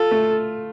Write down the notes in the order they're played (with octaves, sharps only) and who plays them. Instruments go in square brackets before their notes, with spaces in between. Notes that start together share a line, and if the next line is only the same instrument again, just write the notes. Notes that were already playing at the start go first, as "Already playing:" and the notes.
Already playing: [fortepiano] F4 [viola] A4
[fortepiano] A3